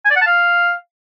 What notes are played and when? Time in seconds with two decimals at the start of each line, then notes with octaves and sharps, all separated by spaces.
0.05 G#5
0.11 D5
0.16 F#5
0.21 A5
0.26 F5